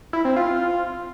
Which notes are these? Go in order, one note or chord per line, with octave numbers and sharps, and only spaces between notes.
E4
C4
F4